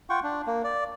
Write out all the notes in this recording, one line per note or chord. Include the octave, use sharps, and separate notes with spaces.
F4 F#5 G5 C#6
D4
A#3
D5